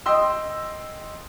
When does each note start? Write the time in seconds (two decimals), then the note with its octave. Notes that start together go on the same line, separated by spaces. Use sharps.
0.06 D#5 G5 C6 E6